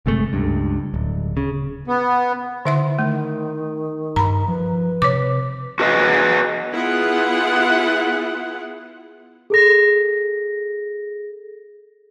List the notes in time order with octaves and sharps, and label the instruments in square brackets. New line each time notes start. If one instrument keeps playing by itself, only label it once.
[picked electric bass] F#1 C3 G#3 A3
C#2 G2
D1
C#3
[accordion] B3
[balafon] D3 E5 C6 [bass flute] E4
[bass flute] D#3 [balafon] A3
[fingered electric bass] G2 [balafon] A#5 B5
[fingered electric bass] F3 [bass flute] B4
[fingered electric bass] C3 [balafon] C#5 D6
[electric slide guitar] F#4 B4 D#5 F5
[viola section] B3 E4 F4 G#4 F#5
[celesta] G#4 A4 A#6